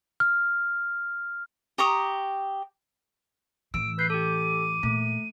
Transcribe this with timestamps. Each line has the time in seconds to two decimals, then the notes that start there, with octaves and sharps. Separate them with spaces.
0.20 F6
1.78 G4 A#5 C#6 D#6
3.74 A2 E3 E6 D7
3.99 B4 G6 C7
4.10 G4 A4 D6 D#7
4.83 A#2 A3